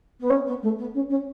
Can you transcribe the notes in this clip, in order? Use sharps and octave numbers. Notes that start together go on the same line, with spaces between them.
B3
C#4
B3
A3
B3
C#4
C#4